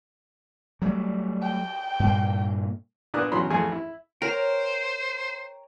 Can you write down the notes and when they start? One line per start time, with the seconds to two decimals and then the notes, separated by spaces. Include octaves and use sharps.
0.82 F#3 G3 A3
1.42 G5
2.00 G2 A#2 A#3
3.14 A#2 B3 D4 A#4 D#6 F#6
3.32 A1 E2 C#3 F#3 B5 C6
3.50 A1 F2 A3 G#4 G#5
3.72 E4
4.22 A#4 C5 C#5 G5 A#5